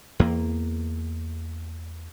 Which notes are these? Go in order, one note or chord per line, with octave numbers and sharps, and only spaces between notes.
E2 A#3